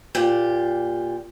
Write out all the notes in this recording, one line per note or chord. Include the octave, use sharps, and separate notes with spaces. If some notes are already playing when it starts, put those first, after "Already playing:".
A#2 G4